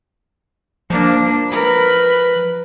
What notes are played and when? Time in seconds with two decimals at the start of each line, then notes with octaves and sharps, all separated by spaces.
0.90 F3 A#3 D4
1.51 A#4 B4 B5